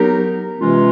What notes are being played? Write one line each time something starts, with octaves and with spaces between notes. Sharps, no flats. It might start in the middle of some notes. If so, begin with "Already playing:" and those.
Already playing: F#3 B3 D#4 G4 A#4
C3 E3 G#3 C#4 F4